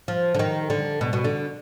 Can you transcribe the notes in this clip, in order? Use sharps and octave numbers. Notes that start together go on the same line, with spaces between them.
F3
D3
D#3
D3
B2
B2
D3